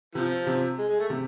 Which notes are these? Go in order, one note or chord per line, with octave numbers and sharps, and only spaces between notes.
C3 F3
C3
G#3
G#3
A3
C3